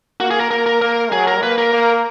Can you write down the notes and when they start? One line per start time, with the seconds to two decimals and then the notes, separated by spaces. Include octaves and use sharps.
0.20 A#3 F#4
0.31 G#4
0.40 A#4
0.51 A#3 A#4
0.66 A#4
0.81 A#3 A#4
1.12 F#3 G#4
1.27 A#4
1.43 A#3 B4
1.58 A#4
1.73 A#3